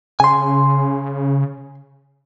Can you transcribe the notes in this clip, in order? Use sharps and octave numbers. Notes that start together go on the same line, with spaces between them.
C#3 G#5 C6